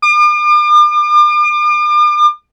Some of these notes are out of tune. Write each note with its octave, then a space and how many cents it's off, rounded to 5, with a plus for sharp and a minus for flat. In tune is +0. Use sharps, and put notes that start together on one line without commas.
D6 +40